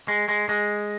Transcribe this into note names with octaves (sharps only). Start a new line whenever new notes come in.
G#3
G#3
G#3